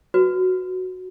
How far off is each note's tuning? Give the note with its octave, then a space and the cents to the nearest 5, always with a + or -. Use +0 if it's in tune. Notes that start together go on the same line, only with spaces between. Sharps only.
F#4 +0 B4 +0